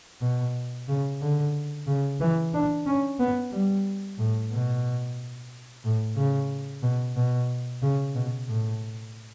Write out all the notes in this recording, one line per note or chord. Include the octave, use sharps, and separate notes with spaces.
B2
C#3
D3
C#3
E3
D4
C#4
B3
G3
A2
B2
A2
C#3
B2
B2
C#3
B2
A2